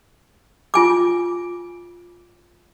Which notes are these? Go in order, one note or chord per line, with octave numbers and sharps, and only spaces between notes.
F4 G#5 D6